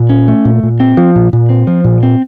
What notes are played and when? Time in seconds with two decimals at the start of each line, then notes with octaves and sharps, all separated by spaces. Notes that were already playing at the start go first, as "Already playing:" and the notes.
Already playing: A#2
0.10 C#4
0.28 A3
0.45 A#2
0.63 A#2
0.80 C4
0.97 F3
1.16 A#2
1.33 A#2
1.49 C4
1.67 F3
1.84 A#2
2.03 C4